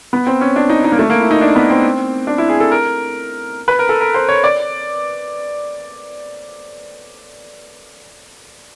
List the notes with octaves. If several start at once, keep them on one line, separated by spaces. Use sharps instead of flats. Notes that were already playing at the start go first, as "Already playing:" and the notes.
B3
C4
C#4
D4
D#4
D#4
A#3
A3
A#3
E4
D#4
D4
B3
C4
D4
E4
G#4
A4
A#4
B4
A#4
A4
A#4
C5
C#5
D5